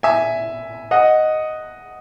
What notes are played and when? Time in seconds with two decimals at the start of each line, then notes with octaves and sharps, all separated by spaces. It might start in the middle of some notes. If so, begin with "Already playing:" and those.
0.03 E5 G#5
0.91 D#5 F#5